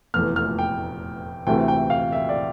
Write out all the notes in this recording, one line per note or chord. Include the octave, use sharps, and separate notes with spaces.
F1 E2 E3 A3 F6
F6
G5
D2 C3 E3 A3 G5
G5
F5
E5
D5